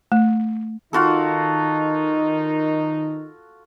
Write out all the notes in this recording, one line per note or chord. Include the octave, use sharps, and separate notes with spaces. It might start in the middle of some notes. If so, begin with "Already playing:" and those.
A3
D#3 D#4 F4 F#4 A4